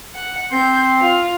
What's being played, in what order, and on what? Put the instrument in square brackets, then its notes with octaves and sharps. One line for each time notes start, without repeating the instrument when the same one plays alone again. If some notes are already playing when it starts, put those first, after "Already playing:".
[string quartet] F#5
[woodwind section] C4 [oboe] C6 [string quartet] G6
[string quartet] F4